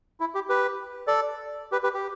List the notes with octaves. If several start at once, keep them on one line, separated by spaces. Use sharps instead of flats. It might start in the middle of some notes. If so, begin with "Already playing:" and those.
E4
G4
G4 B4
A4 D5
G4 B4
G4 B4
G4